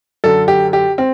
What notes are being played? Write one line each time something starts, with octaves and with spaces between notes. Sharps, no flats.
F#2 D3 A4
G4
G4
C4